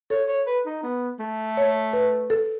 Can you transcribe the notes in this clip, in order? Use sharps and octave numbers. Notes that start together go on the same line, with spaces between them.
A4 C#5
C#5
B4
D#4
B3
A3
C#5
B4
A4